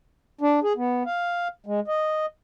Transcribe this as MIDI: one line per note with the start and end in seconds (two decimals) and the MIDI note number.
0.41 0.60 62
0.63 0.73 68
0.76 1.03 59
1.06 1.48 77
1.66 1.80 56
1.88 2.26 75